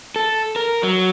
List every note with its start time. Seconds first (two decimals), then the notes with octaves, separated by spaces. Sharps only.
0.16 A4
0.56 A#4
0.83 F#3